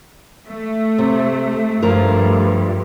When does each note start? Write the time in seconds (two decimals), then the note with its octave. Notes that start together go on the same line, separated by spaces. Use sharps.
0.48 A3
0.98 C3
1.82 G2 F3 A3 A#4